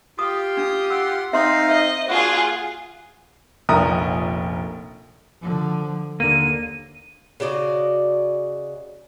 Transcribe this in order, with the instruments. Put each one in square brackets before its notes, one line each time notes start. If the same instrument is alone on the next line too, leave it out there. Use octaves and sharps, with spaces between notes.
[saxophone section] F4 G4 [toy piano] D#6
[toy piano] D4 [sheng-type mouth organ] D#6
[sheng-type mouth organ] F#5 C6 [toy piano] E6
[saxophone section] C4 [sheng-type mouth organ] D#4 F5 [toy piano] E5 C6
[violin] D#5 [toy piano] E5
[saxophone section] A#3 D4 F#4 [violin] F4 G#4 [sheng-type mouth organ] F#5
[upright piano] F1 A#1 A#2 A#5 D#6
[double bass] D3 F3
[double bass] D#2 [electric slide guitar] D3 A#3 [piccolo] D#7
[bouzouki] C#3 F#4 D5 D#5